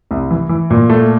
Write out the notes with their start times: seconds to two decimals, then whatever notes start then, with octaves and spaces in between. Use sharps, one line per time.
0.11 C2
0.31 E3
0.49 E3
0.70 A#2
0.90 A3